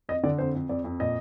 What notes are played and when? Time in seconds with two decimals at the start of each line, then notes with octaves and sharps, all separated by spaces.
0.09 F2 D#5
0.23 D3 D5
0.38 F2 C5
0.55 F2
0.69 F2 D5
0.84 F2
1.00 A#2 D#5